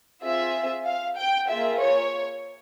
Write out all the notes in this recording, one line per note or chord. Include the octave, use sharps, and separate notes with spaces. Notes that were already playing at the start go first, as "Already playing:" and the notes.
C4 F4 G#4 E5
F5
G5
A#3 F4 G#4 E5
C#5